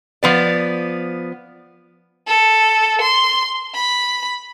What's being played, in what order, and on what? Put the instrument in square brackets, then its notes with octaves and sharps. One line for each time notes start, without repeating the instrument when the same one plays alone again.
[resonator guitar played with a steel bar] F3 B3 D5
[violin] A4
C6
B5